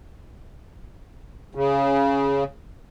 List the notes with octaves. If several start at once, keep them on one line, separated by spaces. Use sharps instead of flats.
C#3